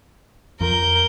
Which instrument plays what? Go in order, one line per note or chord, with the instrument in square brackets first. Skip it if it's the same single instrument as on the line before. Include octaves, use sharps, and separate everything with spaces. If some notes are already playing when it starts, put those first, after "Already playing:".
[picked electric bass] F2 F3 [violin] A#4 G6